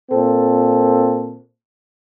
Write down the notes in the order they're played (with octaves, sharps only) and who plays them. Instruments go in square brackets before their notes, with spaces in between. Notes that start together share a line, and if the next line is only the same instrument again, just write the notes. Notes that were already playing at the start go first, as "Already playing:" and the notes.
[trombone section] A#2 C4 A4